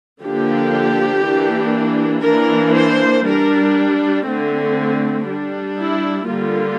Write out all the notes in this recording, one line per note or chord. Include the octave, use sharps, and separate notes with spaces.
D3 F3 A#3 D4 G4
E3 A#3 D4
E3 A#3 D4 A#4
C5
G3 D4 A#4
D3 A3 C4
G3 D4
E4
D3 G3 A#3 F4